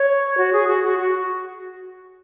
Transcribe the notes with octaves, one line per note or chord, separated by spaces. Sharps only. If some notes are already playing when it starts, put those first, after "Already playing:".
Already playing: C#5
F#4
G#4
F#4
F#4
F#4